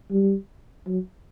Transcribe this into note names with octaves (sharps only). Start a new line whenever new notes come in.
G3
F#3